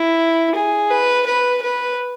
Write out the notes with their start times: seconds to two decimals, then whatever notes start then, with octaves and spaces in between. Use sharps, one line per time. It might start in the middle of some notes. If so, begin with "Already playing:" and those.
Already playing: E4
0.55 G#4
0.91 B4
1.26 B4
1.62 B4